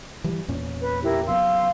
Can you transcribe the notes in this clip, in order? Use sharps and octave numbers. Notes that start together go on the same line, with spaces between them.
E3 G3
E2 A#2 C#4
B4
E4 G4 A#4
C#3 F#3 B3 F5 C6 E6